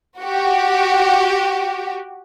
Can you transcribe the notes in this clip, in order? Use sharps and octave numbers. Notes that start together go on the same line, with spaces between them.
F#4 G4